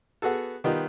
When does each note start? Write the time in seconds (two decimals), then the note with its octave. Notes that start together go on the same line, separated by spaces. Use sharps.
0.22 B3 F#4 G#4 A4
0.64 D#3 G3 B3 D#4 F4 G4